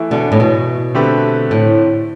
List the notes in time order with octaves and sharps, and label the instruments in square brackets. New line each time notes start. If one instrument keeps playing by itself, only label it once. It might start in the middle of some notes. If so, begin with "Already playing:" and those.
Already playing: [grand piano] E3 A3 E4
[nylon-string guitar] B2 D3
A2
B2
[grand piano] D3 A3 C4 G4 B4
[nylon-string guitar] A2